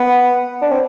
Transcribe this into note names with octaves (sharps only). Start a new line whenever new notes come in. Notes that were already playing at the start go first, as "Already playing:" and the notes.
Already playing: B3
D4
C4